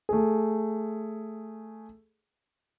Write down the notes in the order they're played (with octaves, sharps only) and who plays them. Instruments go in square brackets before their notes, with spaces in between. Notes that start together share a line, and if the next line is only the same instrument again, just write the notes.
[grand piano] A3 G#4